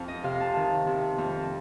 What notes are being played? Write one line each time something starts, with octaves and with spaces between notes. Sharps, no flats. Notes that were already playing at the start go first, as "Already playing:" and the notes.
Already playing: F2
D#5
C3 F5
A5
D#3
C3
F2